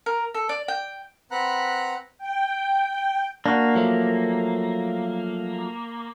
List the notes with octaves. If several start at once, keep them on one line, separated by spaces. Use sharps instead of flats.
A#4
A4
D5
G5
C4 B4 F#5 A#5 B5 F#6
G5
A#3 D4 F#4
F3 F#3 A3